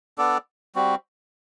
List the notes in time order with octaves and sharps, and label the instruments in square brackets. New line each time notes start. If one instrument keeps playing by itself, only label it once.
[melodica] B3 D4 A4 D5
G3 C4 F#4